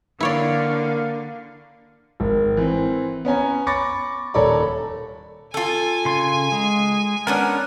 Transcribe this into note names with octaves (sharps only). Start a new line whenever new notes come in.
D3 A#3 E4 C#5 D5 F5
G#1
E3 C4
B3 C#4 G#5 A#5
B5 C#6 D6 A6 A#6 C#7
D#1 A4 C#5 D5 A#5 B5
F4 A4 G#5
C#3 C6
G#3
B3 C#4 D4 A#4 F#5